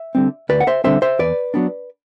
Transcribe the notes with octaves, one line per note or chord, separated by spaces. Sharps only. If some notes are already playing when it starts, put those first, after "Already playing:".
Already playing: E5
D3 G3 C4
D2 B4 D5
F#5
C5 E5
D3 G3 C4 C5 E5
C5 E5
E2 B4 D5
F#3 B3 D4